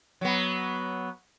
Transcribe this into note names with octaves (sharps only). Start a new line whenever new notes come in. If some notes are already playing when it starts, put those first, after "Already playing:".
F#3 B3